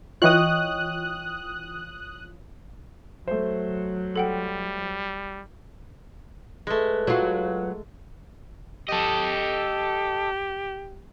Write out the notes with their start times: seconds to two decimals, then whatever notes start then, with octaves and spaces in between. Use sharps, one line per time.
0.22 E3 F4 C#5 D#5 G5 D#6 F#6
3.28 F#3 A3 C5
4.16 G3 A4 F#5 G5
6.67 G#3 A3 B4
7.07 F#3 F4
8.89 G4 A4 D#5